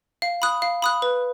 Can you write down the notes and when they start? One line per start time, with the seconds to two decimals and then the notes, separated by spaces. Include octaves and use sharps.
0.22 F5
0.42 B5 D#6 F#6
0.62 F5
0.82 B5 D#6 F#6
1.02 B4